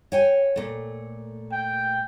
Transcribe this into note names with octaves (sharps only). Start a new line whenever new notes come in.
C#5 G5 G#5
A#2 A3
G5